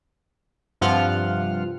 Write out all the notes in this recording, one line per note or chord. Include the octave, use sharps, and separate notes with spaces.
G2 C3 F3 F4 F#5 F6